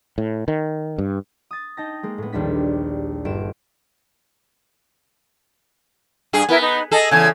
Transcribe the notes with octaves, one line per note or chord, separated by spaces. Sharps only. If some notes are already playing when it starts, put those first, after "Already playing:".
A2
D#3
G2
D#6 A6
D#4 G5 A5 A#6
G#3 A#3
A2 B3
A#1 D#2 G3 D4 B6
G1 D7 E7
G2 G#4
B3 E4 A#4 B4
D#4 B4
G#4 A4 D#5
E2 C#3 G#5 G#6